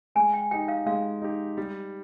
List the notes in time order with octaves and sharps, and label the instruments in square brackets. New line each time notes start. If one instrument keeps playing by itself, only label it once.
[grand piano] G#3 [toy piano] G#5
[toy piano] G5
[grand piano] D#4 G4 [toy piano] G5
[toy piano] F5
[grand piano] G#3 [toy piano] F5
[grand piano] D#4 G4
G3